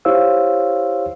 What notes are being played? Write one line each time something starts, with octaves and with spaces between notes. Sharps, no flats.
E4 G4 C5 C#5 F5 E6